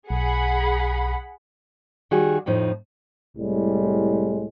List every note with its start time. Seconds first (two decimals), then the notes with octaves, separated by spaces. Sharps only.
0.10 B1 G#4 F#5 B5
2.11 D#3 G3 F#4 G#4
2.46 F2 A2 F3 D#4
3.37 C2 A2 G3 G#3